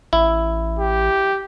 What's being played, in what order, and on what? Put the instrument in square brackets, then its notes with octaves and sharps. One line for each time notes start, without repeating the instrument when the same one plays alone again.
[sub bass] A1 [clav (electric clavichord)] E4
[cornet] G4